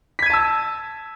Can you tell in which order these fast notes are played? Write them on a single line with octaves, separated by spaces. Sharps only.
B6 G#6 D#7 A5 E6